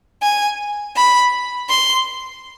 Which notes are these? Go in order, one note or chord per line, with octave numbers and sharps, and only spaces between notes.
G#5
B5
C6